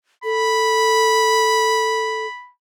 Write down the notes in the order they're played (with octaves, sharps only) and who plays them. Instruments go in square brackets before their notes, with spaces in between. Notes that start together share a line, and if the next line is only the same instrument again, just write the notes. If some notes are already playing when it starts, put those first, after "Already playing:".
[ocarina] A4 [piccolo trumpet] B5